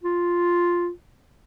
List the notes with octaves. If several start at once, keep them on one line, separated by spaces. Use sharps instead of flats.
F4